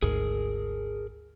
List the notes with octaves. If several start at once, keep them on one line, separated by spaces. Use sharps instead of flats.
G#1 D2 G#2 G#4 A#4